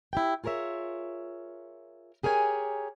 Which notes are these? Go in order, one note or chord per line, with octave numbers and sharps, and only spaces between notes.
E4 G4 G5
F4 G#4 A#4 C#5 E5
G4 G#4 A#4 C#5 G#5